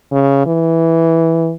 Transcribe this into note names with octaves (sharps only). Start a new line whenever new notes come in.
C#3
E3